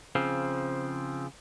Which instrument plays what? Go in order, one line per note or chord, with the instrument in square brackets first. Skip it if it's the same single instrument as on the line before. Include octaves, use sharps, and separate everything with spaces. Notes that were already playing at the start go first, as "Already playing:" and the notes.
[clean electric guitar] C#3 F3 C4